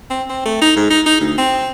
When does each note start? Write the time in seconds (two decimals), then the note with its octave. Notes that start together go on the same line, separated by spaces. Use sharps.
0.10 C4
0.30 C4
0.45 A3
0.62 D#4
0.76 G#2
0.90 D#4
1.06 D#4
1.21 D2
1.38 C4